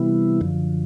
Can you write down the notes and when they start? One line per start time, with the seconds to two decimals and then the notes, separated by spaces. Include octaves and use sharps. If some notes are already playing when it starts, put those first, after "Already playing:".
Already playing: C3 E3 G3 B3 E4
0.41 F#2 D3 F3